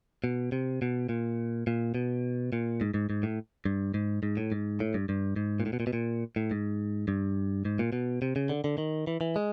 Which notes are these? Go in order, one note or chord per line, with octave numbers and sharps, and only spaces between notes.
B2
C3
B2
A#2
A#2
B2
A#2
G#2
G#2
G#2
A2
G2
G#2
G#2
A2
G#2
A2
G2
G2
G#2
A#2
A2
B2
A#2
B2
A#2
A2
G#2
G2
G#2
A#2
B2
C3
C#3
D3
D3
D#3
E3
E3
G#3